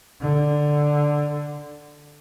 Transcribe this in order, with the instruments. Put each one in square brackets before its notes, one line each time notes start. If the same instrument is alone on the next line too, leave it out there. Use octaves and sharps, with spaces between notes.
[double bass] D3